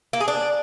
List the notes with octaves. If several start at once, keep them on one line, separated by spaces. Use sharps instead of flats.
A#3
G#4
D4